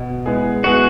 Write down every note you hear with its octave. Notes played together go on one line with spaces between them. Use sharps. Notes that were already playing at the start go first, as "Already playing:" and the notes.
Already playing: B2
G#3 B3 E4 G#4
G#3 B3 E4 F#4 G#4